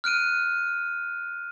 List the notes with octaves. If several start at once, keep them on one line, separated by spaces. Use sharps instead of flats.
F6 F#6 D7 D#7